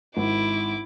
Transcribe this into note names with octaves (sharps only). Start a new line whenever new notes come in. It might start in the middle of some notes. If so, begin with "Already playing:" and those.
G#1 E4 D6